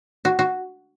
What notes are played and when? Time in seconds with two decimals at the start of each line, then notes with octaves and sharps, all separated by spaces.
0.25 F#4
0.39 F#4